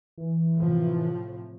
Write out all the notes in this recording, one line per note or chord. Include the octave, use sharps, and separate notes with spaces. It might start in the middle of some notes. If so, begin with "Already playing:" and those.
E3
A2 C3 F3